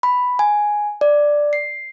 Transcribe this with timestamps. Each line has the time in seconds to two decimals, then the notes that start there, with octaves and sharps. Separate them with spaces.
0.03 B5
0.39 G#5
1.01 D5
1.53 C7